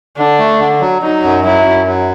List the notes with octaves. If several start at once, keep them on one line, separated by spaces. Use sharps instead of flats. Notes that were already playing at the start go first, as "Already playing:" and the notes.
D3 D4
A3
D3
F#3
F#3 D#4
F#2
F#3 E4
F#2
F#3